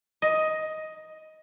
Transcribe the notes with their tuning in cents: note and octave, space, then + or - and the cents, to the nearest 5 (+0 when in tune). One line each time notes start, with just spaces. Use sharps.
D#5 +10